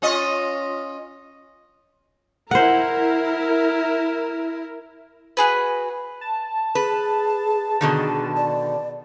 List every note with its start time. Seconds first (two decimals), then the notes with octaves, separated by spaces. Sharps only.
0.02 C#4 F4 D#5
2.51 E4 A#4 C5 F#5
5.37 F#4 G#4 B4
6.21 A5
6.75 G#4 B4
7.81 B2 D3 D#3 G#4
8.37 D5